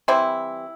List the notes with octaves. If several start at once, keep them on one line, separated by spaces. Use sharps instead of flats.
E3 G3 C4 E4